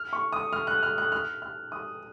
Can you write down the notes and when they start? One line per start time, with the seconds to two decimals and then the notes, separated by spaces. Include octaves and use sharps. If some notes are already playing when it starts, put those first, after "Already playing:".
Already playing: F6
0.13 C#6
0.33 D#6
0.53 F6
0.67 F#6
0.83 F6
0.98 F#6
1.12 F6
1.42 F6
1.72 D#6